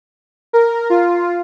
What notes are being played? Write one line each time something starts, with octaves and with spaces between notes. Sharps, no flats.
A#4
F4